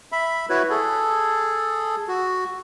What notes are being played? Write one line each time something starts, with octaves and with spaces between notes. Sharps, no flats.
E5 B5
E4 F#4 B4 C#5
G#4 A4
F#4